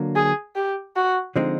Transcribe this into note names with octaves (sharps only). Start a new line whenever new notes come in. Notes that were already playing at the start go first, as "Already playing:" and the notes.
Already playing: D3 F#3 A#3
G#4
G4
F#4
D3 F3 G#3 C4 D#4